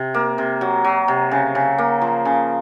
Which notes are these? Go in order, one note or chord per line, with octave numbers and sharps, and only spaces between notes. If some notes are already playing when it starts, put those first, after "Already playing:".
Already playing: C3
A#3
C3
F#3
F#3
C3
C#3
C#3
A#3
F3
C#3